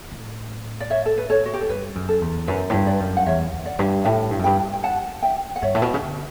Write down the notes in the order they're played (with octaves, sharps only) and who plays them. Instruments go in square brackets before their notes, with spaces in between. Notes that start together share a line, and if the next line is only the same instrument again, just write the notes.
[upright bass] A2
[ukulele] D5
C#5 E5
A4
B4
A4 C#5
F#4
G4
A4
[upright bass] G2 [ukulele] B4
[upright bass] F#2
[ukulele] A4
[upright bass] E2
[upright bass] F#2 [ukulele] B4
[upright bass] A2
G2
[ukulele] B4 D5
[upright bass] F#2
[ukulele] F#5
[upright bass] E2 [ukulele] C#5 E5
[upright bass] E2
[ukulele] D5 F#5
[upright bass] G2
[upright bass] A2 [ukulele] E5 G5
[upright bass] G2
F#2
[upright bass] G2 [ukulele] G5 B5
[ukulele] G5
F#5 A5
E5 G5
F#5
[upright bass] G2 [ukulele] C#5 E5
[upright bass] A2
B2
C#3
D3